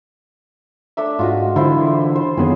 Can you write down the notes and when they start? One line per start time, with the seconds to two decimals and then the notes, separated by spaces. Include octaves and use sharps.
0.97 A3 D4 E5
1.19 G#2 F4 F#4 D#5
1.56 D3 E3 E4 F4 C5
2.15 C5
2.37 F#2 D#3 B3 G#4 C#5